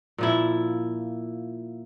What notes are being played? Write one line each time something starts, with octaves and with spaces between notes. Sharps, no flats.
A#2 F3 E4